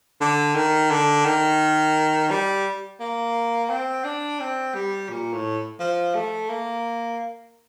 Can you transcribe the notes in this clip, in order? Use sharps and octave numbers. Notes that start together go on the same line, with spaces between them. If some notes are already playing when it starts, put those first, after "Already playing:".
D3
D#3
D3
D#3
G3
A#3
C4
D4
C4
G3
A#2
A2
F3
A3
A#3